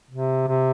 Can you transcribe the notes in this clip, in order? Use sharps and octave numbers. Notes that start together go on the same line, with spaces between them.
C3
C3